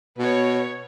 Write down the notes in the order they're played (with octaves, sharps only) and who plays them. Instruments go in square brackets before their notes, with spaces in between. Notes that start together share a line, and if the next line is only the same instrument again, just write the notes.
[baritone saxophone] B2 [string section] B4 C#5